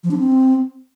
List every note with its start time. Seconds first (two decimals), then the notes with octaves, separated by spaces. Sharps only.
0.04 F3
0.11 D4
0.18 C4